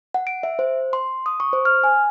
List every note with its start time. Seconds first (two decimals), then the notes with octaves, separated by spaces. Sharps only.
0.14 F#5
0.27 D7
0.43 E5
0.59 C5
0.93 C6
1.26 D#6
1.40 C#6
1.53 C5
1.65 F6
1.84 G#5